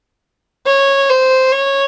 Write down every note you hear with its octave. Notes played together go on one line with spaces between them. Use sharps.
C#5
C5
C#5